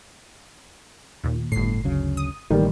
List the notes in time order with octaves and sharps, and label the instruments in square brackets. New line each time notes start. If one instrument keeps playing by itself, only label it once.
[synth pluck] D#2 A#2
[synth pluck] G1 C7 [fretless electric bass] A2
[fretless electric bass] D2 C#3 F#3
[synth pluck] D#6
[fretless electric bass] A1 [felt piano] D#3 G3 A#3